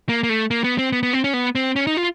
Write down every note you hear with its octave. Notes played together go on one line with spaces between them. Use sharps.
A#3
A#3
A3
A#3
B3
C4
B3
B3
C4
C#4
B3
C4
C#4
D#4
F4